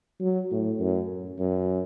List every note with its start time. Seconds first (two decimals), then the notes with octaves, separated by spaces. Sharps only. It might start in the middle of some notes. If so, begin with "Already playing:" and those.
0.20 F#3
0.51 A2
0.80 F#2
1.39 F#2